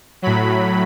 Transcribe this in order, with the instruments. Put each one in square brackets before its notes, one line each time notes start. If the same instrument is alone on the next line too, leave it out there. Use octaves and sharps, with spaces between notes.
[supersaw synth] A2 F#3 B5